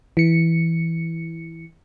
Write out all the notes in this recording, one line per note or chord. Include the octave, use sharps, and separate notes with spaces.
E3 C#7